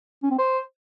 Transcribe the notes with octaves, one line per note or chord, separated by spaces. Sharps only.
C#4
C4
C5